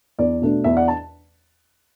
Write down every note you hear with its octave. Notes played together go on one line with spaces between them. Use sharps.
E2 D5
B2 A3 D4
E2 E5
D5 F#5
A5